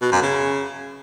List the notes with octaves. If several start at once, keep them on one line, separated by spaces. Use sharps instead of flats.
B2
F#2
C#3